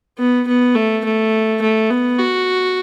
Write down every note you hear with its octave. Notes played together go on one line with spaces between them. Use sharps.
B3
B3
A3
A3
A3
B3
F#4